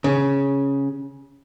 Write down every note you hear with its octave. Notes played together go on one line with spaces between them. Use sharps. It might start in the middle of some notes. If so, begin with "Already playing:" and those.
C#3